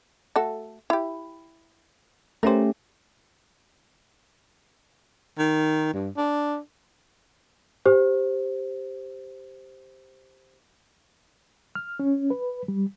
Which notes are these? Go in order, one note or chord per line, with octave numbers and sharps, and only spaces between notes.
A3 F#4 A4
E4 G4
A3 C#4 G4 A#4 C5
D#3
G2
D4
G4 C5
F6
C#4
B4
G3